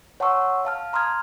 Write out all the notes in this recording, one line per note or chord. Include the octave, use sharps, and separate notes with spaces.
C#5 F#5 A5 C6 C#6 E6
F5 A5 F6
A#5 C6 D#6 F6 G#6